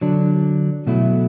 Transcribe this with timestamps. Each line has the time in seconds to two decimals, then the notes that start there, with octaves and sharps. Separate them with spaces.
0.01 D3 F#3 D4
0.87 B2 F#3 A3 E4